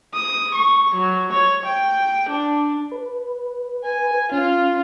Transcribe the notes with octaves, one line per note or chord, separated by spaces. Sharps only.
D#6
C#6
F#3
C#5
G5
D4
B4
G#5
C#4 F4